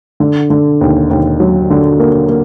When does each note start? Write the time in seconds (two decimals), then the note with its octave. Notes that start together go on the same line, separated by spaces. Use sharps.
0.20 D3
0.50 D3
0.81 D#2
1.10 D#2
1.40 F#3
1.70 D3
1.99 A#3
2.29 A#3